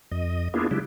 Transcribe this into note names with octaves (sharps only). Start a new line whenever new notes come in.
F2 D#5
A#3 B3 D4 E4 F4 G#4
C#3 F#3 G#3 D4 E4 G4